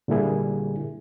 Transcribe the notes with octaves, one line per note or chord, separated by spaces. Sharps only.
A#2 D3 G3 A#3 E4 G#4